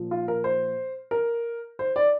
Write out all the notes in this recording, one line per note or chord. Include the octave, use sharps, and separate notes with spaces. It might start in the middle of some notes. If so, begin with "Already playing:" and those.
Already playing: A#2 F3
F4
A#4
C5
A#4
C5
D5